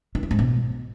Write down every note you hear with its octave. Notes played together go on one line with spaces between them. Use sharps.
D#3
E3
G#2
B2